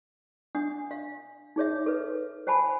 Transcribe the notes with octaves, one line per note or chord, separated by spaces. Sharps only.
D4 F#5 D#6
F5
D#4 G#4 C#5 E5
A4 B4
C5 F#5 G#5 A5 B5